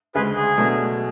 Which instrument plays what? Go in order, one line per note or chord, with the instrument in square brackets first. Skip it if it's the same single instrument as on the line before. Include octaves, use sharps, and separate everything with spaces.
[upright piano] D2 C#3 G#3 [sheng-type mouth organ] G#4 B4
[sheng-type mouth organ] G#4
[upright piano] B2 F#3 A3 D4